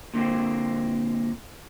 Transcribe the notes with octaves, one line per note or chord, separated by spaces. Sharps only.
A#2 D3 A#3 C4